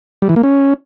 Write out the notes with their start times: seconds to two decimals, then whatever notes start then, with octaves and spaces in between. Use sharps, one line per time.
0.22 G3
0.29 E3
0.36 A#3
0.43 C#4